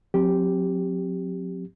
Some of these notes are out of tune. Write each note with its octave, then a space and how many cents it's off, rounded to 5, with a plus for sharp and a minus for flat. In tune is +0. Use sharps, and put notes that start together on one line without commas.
F#3 -40 C4 +5 G4 +0